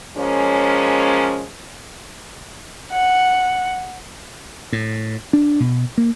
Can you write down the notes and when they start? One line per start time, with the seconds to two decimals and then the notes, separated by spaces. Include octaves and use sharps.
0.17 F3 G#3 A#3 C#4
2.92 F#5
4.72 A2
5.33 D4
5.60 B2
5.98 A#3